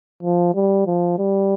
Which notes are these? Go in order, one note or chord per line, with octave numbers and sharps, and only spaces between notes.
F3
G3
F3
G3